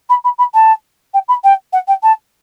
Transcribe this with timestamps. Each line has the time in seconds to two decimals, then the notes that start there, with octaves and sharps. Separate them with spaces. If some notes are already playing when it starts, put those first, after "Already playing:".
0.09 B5
0.24 B5
0.38 B5
0.54 A5
1.14 G5
1.28 B5
1.44 G5
1.73 F#5
1.88 G5
2.03 A5